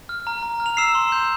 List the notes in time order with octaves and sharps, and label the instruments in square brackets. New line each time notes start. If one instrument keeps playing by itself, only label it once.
[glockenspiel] F6
A#5
A#5
F6
F7
E6 C7 E7
C6
G6